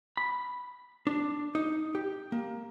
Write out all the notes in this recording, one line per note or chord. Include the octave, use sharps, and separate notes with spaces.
B5
D4
D#4
G4
A#3